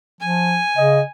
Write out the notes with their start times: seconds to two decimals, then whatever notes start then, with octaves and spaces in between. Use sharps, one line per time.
0.21 F3 G#5
0.77 C#3 D#5